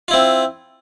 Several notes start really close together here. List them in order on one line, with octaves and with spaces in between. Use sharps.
F4 E4 C4